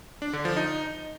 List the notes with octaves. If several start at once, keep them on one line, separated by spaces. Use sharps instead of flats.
D4
D3
F3
D#4